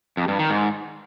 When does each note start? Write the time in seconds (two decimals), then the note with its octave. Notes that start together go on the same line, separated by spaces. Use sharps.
0.17 F2
0.28 G2
0.39 D#3
0.50 G#2